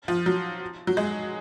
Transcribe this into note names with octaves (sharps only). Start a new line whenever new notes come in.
F3
F#3
F#3
G#3